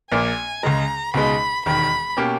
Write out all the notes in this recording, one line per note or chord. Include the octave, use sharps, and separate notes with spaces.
A#1 A#2 A#3 G#5
C#2 C#3 G#3 A#5
C#2 B2 G#3 D#4 B5
E1 D#2 D#3 B5
B2 A#3 C#4 G4